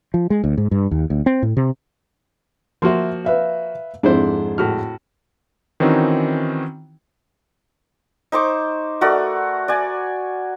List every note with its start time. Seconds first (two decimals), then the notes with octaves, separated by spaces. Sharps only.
0.14 F3
0.30 G#3
0.44 D2
0.57 G#2
0.71 G2
0.91 D#2
1.10 D2
1.26 C4
1.42 A2
1.57 C3
2.82 F3 A#3 F#4 E5 C6
3.25 B4 E5 F5
4.03 F2 G#2 D4 E4 C5
4.58 A2 F#4 F6
5.80 D#3 E3 C4 C#4 D#4 F#4
8.32 D#4 C5 C#6 D6
9.01 A3 F#4 A#4 D5
9.68 D5 G#5